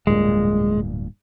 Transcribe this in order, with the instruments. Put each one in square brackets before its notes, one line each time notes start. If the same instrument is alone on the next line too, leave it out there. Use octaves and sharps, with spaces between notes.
[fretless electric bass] D1 G2 A#2 [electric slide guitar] G#3